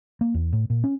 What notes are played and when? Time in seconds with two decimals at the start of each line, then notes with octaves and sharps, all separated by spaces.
0.21 A#3
0.34 E2
0.53 A2
0.70 A#2
0.84 C#4